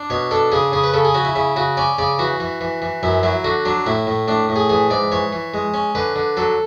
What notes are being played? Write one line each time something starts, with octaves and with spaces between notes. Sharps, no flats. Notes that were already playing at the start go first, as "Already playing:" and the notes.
Already playing: D4
B2 C#5
D4 A4
C#3 G#4
C#3 G#4
B4
C#3 A4
G#4
C#4 F#4
E4
C#3 E4
C#3 F#4
C#4 D5
C#3 D5
E3 F#4
E3
E3
E3
F#2 E4
F#3 E4
D3 F#4
F#3 D4
A2 E4
A2
A2 D4
A2
G#4
E3 G#4
G#2 D5
E3 C#5
E3
G#3
C#4
D3 B4
D3
F#3 A4